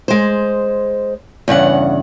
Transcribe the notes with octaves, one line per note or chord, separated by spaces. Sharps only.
G#3 C5
E2 G2 C#3 F#5